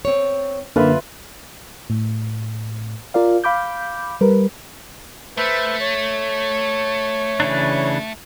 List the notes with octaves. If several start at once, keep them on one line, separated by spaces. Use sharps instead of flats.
C4 C#5
F#2 D3 A#3 F4 B4 E5
A2
F4 A#4 D5 F5
F5 B5 D6 G6
G3 A#4 B4
A3 B4 C5 E5
C#5
C#3 E3 D4